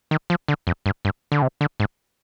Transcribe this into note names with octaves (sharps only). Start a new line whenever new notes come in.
D#3
F3
D3
F2
G2
G2
D3
C3
D3
G#2